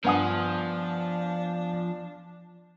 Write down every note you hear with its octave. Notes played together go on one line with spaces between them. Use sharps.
G2 F3 B3 D4 F#5 G#5 D#6